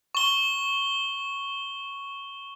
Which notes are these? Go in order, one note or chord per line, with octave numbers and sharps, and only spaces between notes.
C#6 G7